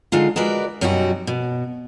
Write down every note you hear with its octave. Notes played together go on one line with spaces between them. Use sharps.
D3 G#3 D#4 F4
G#3 F#4 A#4 B4 D5
F#2 B2 G3 D#4 F#4
B2